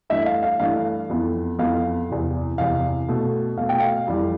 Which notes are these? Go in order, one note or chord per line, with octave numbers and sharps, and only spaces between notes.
G2 E3 A3 E5
F5
F5
G2 E3 A3 F5
F2 E3 B3
F2 E3 B3 F5
E2 C3 E3
E2 C3 E3 F5
B2 A3
B2 A3 F5
G5
F5
F2 E3 G3